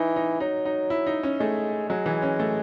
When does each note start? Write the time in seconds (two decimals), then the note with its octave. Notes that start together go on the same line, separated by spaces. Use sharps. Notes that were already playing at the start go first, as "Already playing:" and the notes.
Already playing: E3 D#4
0.16 D#4
0.40 F#3 D#4
0.66 D#4
0.90 E4
1.07 D#4
1.23 C#4
1.40 G#3 A3
1.89 F#3 G#3
2.06 E3
2.22 C#4
2.40 A3